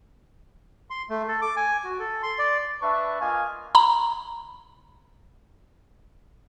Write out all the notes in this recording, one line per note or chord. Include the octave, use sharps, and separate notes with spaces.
C6
A3
A4
D6
G#5
F#4
A4
C6
D5
D4 B4 E5 A5 C#6
A#3 F4 D#5 F5 G#5
A#5 B5